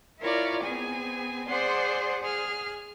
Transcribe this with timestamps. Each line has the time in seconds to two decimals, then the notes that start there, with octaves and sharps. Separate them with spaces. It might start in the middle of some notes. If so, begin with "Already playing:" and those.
0.20 E4 F4 A#4 C#5 D5
0.61 B3 C4 G#4 G#5
1.48 G#4 C5 D5 F#5 C6
2.23 G#4 F6